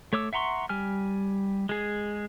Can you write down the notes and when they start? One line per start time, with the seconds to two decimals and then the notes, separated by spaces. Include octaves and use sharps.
0.13 A3 C#5 D6 E6
0.33 E5 F#5 A#5 C6 C#6
0.69 G3 G#5 F6
1.69 G#3 G#4